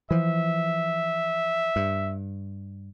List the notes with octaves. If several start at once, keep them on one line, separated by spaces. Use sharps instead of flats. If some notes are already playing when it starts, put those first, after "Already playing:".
E3 F3 E5
G2